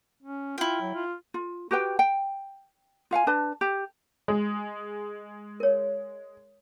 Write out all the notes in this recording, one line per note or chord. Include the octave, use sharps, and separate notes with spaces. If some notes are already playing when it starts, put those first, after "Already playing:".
C#4
E4 F4 G5
F#3
F4
F4
F#4 G4 B4 G5
G5
F4 F5 F#5 G#5
D4 B4 A5
G4
G#3
A#4 C#5